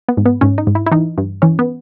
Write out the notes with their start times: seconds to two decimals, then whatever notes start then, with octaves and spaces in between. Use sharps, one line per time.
0.08 B3
0.17 G#2
0.26 B3
0.41 G#2 C#4
0.58 D#4
0.67 G#2
0.75 E4
0.86 E4
0.91 E3 D#4
1.18 G2
1.42 E3 C#4
1.59 B3